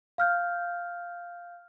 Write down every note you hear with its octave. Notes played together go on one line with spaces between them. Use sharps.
F5 F6 G6